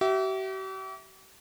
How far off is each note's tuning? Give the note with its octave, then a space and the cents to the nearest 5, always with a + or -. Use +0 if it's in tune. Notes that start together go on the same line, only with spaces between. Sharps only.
G4 -45 E5 +0